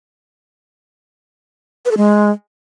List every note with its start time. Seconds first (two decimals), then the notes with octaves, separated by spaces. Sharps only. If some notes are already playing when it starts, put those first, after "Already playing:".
1.85 B4
1.91 A4
1.97 G#3